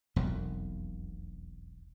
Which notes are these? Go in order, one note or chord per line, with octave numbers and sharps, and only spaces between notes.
E1 B1 F2